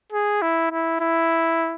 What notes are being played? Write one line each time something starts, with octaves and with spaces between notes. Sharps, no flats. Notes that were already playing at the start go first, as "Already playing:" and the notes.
G#4
E4
E4
E4